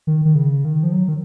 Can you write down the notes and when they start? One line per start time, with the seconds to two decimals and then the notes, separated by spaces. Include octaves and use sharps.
0.07 D#3
0.25 D#3
0.35 C#3
0.65 D#3
0.83 F3
0.92 F#3
1.08 D#3